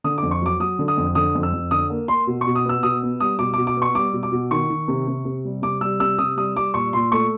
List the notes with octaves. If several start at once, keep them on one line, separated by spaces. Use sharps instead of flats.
D3 D#6
D6
F2
C#6
F#3 D6
F#3 D#6
D3
D#6
F2
D3 D#6
F2
E6
F2
D3 D#6
A#3
A#3 C6
B2
C#6
B2
D#6
B3 E6
B2 D#6
B3
G3 D#6
B2 D6
D6
B2
D6
B3
C#6
G3 D6
B2
D6
B2
D#3 C#6
D#3
C3
C3
C3
G3
C3 D6
G3 E6
C3 E6
C3 D#6
G3 D#6
G3 D6
A#2 C#6
A#2 C6
A3 C#6